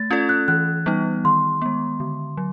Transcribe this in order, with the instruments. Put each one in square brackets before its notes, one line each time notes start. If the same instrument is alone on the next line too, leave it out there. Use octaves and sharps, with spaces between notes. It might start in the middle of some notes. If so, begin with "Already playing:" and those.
Already playing: [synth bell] A3 [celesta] A6
[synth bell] C#4 F4 A4 D5 [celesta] G#6
[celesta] F#6
[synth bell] E3 [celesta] F#6
[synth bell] G3 B3 D#4
[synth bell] D#3 [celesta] C6
[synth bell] G#3 B3
D3
F#3